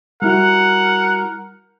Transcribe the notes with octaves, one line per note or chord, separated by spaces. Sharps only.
G3 E4 F#4 A#4 F#5